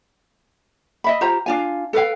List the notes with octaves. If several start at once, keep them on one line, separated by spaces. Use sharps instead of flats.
D#5 E5 B5
F4 G4 C5 A#5
D4 F4 G#5
A4 B4 F5 G5